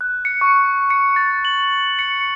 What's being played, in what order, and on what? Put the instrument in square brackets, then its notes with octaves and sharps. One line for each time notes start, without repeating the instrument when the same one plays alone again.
[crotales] F#6
C#7
C#6
C#7
A6
F#7
C#7